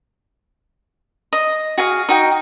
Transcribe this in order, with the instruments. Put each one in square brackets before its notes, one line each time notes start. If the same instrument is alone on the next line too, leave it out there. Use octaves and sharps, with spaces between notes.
[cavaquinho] D#5
F#4 G#4 F5
D#4 F#4 G5